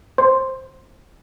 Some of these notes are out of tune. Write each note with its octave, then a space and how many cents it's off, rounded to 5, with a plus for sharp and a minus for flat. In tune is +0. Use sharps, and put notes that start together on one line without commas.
C5 +15 C6 +0